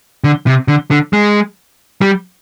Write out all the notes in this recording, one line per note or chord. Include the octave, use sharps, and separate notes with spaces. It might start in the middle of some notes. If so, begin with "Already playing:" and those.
D3
C3
D3
D3
G#3
G3